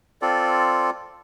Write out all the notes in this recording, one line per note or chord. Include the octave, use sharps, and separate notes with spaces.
C4 F4 A4 D5